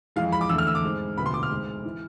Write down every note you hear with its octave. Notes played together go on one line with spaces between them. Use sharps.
F2 E3 G#3 F5
B5
D6
E2 D3 A3 E6
F6
E6
D6
G#2 G#3 C4
E1 D2 C3 F3 B3 B5
C6
D6
F6
G#2 G#3 C4
E3